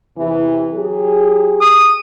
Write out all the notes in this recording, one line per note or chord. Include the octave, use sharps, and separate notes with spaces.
E2 C3 E3
F#3 G4 G#4
D#6